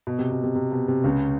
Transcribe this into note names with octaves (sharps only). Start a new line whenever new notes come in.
B2
C3
B2
C3
C3
B2
C3
C#2 C#3